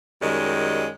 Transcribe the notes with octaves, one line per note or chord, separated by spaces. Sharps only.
F#2 D#3 G3 G#3